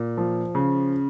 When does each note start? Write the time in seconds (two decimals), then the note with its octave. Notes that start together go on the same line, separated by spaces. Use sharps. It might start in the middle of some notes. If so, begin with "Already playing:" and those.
Already playing: A#2
0.18 F3
0.55 C#3